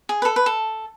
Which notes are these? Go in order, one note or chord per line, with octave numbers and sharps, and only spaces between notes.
G#4
B4
A4
B4
A4